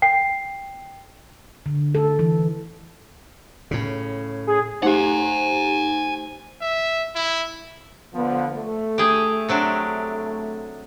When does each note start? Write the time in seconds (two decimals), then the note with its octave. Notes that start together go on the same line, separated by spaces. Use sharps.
0.02 G5 C7
1.66 D3
1.95 A4
2.19 E3
3.71 A2 C#3
4.47 G#4
4.83 A3 D#4 G4 C5 F#5 G#5
6.62 E5
7.15 E4
8.14 D3 F3 B3
8.54 A3
8.98 G4 G#4
9.49 C3 F#3 D4